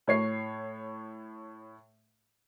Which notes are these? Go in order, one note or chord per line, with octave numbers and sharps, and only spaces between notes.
A2 C#5 C7